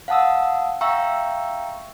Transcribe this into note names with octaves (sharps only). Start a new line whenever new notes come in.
F5 F#5 A5 D#6 E6
E5 F5 G5 A#5 C#6 E6